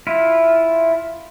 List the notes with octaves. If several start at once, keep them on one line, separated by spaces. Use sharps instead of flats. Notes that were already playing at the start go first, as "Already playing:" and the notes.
E4 F4